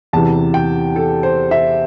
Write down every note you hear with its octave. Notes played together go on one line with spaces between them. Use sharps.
E2 C3 E3 A5
G5
A4
C5
E5